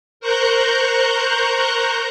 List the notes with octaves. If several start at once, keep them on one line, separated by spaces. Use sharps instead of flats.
A#4 C5 A#5 C#6 F#6 G6